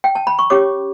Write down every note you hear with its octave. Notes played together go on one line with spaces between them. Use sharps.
G5
A5
B5
C#6
C#4 G4 C#5 D6